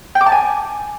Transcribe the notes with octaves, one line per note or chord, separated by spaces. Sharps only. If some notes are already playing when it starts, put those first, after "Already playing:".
G5
D6
A5
G#5